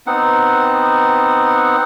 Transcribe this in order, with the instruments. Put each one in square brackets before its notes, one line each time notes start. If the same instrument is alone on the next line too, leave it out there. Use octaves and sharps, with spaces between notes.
[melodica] B3 C4 D#4 F#5